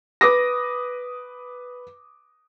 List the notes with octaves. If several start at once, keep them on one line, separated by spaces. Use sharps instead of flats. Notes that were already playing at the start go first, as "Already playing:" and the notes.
B4 D6 D#6 A#6